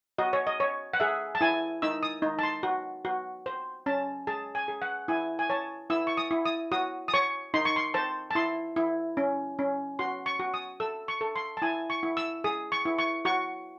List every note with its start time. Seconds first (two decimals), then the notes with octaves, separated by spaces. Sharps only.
0.18 F#4 D#5
0.33 C#5
0.47 D#5
0.60 C#5
0.93 F#5
1.00 G#4 E5
1.35 A5
1.41 E4 G#5
1.82 D#4 E6
2.03 D#6
2.22 D#4
2.39 A5
2.43 C6
2.63 F#4
3.05 F#4
3.46 C5
3.86 C#4 A5
4.27 G#4 A5
4.55 G#5
4.68 G#4
4.82 F#5
5.08 E4 G#5
5.39 G#5
5.50 C#5 A5
5.90 E4 E6
6.07 C#6
6.17 D#6
6.31 E4
6.45 D#6
6.72 F#4 D#6
7.08 D#6
7.14 C#5 C#6
7.54 D#4 C6
7.65 C#6
7.76 C6
7.94 C5 A5
8.31 A5
8.35 E4 C6
8.76 E4
9.17 C#4
9.59 C#4
9.99 F#4 C6
10.26 C#6
10.39 F#4
10.54 D#6
10.80 A4 E6
11.08 C#6
11.21 A4
11.36 C6
11.57 A5
11.62 E4 G#5
11.90 C#6
12.03 E4
12.17 E6
12.44 G#4 D#6
12.72 C#6
12.85 E4
12.99 C#6
13.25 F#4 C#6